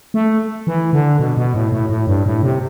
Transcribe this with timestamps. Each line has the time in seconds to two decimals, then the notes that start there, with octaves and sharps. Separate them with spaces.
0.14 A3
0.67 E3
0.93 D3
1.19 B2
1.37 B2
1.54 A2
1.72 A2
1.90 A2
2.07 G2
2.26 A2
2.43 C3